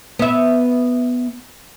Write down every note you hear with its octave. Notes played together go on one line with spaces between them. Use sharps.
B3 E5